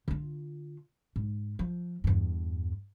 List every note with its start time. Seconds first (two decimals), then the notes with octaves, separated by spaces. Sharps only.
0.08 D3 F4
1.16 G#2
1.59 F3
2.04 E2 G2